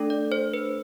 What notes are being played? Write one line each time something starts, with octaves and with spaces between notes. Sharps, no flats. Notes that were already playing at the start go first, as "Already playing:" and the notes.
Already playing: A3 D4 A4
D5
C5
B4